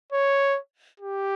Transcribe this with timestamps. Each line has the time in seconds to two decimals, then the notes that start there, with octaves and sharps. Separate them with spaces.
0.12 C#5
1.00 G4